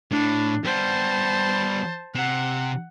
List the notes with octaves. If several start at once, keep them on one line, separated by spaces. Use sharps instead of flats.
A2 D4
G3 B3 C5 A5
C3 F#5